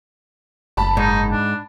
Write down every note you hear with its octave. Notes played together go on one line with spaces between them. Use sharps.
F#1 A5 B5
G#2 D#4
D4